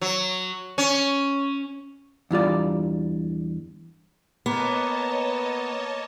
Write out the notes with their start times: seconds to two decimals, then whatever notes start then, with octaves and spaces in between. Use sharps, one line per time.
0.01 F#3
0.78 C#4
2.31 E2 G2 F4 D5
4.46 A#3 B3 B4 C#5 D#5 A5